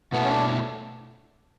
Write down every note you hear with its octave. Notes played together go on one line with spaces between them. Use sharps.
B2 A3 B3 E4 A4
C#4
D4